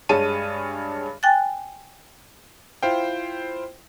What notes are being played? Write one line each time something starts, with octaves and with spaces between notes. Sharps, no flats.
G2 G#3 G#4 C#5 A5 D#7
G5 G#5 F#6 A6
E4 F4 C5 F5 G5